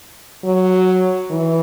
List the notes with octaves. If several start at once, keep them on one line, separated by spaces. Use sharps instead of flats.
F#3
E3